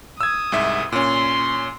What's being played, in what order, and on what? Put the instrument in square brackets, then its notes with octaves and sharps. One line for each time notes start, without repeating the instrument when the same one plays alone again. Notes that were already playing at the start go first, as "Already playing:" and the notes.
[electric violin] D#6 [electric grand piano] E6 G#6
[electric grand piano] C2 G#2 E5
[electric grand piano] A#2 C#4 [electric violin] C6